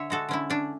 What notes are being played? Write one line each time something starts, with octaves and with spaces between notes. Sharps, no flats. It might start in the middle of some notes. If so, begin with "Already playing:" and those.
Already playing: D3 C#5 E5
G#3 F#4 A4
D3 C#4 E4
C#4 D4